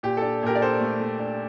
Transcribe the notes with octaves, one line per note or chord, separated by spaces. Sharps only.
A#2 G4
D4 A4
A#2 G4 A#4
D5
D4 A4 C5
A3
A3
D4